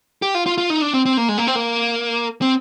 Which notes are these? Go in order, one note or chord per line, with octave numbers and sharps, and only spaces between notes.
G4
F4
F4
F4
D#4
D4
C4
C4
A#3
G#3
A#3
C4
A#3
C4